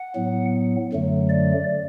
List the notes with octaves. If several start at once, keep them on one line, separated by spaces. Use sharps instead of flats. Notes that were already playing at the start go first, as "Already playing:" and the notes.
Already playing: F#5
A2 F#3 B3
F#2 D3 F#3 A3
D5